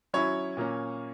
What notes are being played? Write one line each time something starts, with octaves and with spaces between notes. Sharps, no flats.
F#3 C#4 E4 C#5
A#2 A#3 C#4